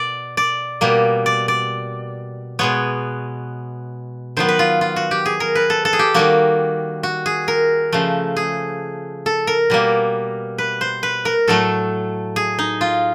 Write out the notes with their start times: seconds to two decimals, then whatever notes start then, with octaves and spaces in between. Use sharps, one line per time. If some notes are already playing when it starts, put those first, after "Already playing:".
Already playing: B2 D5
0.37 D5
0.81 B2 G3 A#3
1.26 D5
1.48 D5
2.59 B2 G#3 B3 C#5
4.37 D#3 F#3 B3 C5
4.49 B4
4.59 F4
4.81 F4
4.96 F#4
5.11 G4
5.26 G#4
5.40 A#4
5.55 B4
5.70 A4
5.85 A4
5.93 G#4
5.99 G4
6.14 D#3 G3 A#3 F#4
7.03 F#4
7.26 G#4
7.48 A#4
7.93 C#3 F3 A3
8.37 G#4
9.26 A4
9.47 A#4
9.70 B2 G3 A#3
10.58 B4
10.81 C5
11.03 B4
11.25 A#4
11.48 A2 F#3 A3 A4
12.36 G#4
12.59 D#4
12.81 F4